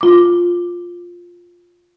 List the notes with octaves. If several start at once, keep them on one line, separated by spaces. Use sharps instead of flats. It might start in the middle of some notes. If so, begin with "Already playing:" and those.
F4 D6